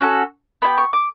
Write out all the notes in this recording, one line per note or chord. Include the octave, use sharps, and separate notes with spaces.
C#4 F#4 A4
B3 E4 G4 B5
C#6
D6